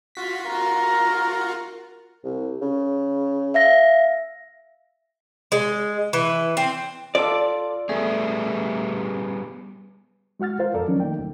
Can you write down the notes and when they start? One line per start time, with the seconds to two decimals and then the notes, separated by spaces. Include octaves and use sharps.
0.15 F4 F#4 B6
0.49 F4 F#4 A#4
2.24 C2
2.62 C#3
3.54 E5 F5 A#6
5.52 G#3
6.13 E3
6.57 C4
7.15 F4 A4 D5
7.89 G3 A3 B3 G#4
10.40 G#3 F#4 F#5 F6 A6
10.59 F4 A#4 C5 F5
10.74 F2 A4 A#4 D5
10.87 D#3 F3 F#3 C#4 D#4
10.99 A3 A#3 D#4 G5
11.19 D2